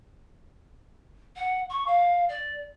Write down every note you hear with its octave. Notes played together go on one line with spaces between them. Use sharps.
F#5
C#6
F5
D5